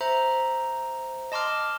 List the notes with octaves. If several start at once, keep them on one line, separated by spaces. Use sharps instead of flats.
C5 E5 A#5
D#5 A5 C6 D6 F6